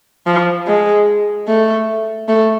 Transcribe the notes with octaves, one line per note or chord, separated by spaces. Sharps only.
F3
G#3
A3
A3